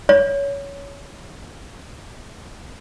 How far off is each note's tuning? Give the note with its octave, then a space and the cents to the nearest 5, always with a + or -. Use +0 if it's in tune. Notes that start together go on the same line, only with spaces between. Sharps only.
C#5 +15